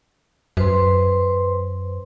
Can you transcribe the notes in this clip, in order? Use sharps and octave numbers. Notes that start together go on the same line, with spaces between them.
F#2 B4 C5 C6